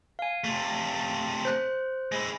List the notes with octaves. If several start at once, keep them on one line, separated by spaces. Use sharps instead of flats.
F5 G#5
C3 A3
C5 F#6
G#3 E4